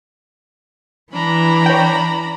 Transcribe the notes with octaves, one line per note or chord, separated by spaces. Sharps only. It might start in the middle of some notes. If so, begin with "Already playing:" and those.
E3 D4 A#5 B5
C#5 G5